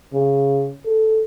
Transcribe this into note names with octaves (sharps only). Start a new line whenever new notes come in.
C#3
A4